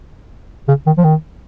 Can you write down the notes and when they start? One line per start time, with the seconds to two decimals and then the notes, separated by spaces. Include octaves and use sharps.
0.68 C#3
0.86 D#3
0.98 F3
1.04 D#3